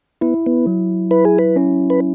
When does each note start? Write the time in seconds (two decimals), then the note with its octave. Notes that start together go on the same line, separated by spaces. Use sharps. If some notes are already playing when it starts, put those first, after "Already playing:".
0.21 B3 E4
0.46 B3
0.67 F#3
1.11 E4 B4
1.25 G#4
1.39 B4
1.56 C#4
1.90 B4